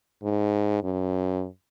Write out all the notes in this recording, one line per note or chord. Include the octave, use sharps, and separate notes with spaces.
G#2
F#2